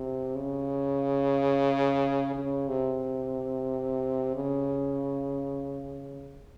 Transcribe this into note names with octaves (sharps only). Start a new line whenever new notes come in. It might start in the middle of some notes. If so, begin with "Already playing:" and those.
Already playing: C3
C#3
C#3
C3
C#3